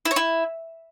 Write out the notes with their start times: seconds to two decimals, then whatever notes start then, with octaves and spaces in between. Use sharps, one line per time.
0.05 E4
0.11 C#5
0.16 E4